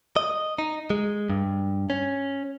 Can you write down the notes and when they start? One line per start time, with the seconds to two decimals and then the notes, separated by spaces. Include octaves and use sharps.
0.16 D#5
0.58 D#4
0.90 G#3
1.30 G2
1.90 C#4